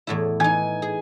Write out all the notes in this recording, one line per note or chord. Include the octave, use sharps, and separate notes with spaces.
E2 A2 E4
E3 D#4 G#5
G#4